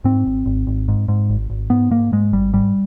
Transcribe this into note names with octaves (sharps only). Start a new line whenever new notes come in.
G#2 C4
G#1
G#1
G#1
G#2
G#2
G#1
G#1
G#2 B3
G#2 A#3
G#2 G#3
G#1 G3
G#2 G3